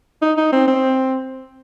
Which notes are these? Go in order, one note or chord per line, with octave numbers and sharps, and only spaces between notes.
D#4
D#4
C4
C4